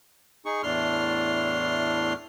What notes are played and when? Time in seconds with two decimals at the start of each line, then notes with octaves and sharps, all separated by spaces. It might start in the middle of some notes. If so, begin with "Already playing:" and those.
0.45 D#4 G#4 C#6
0.63 E2 A2 A3 D4 C6 F6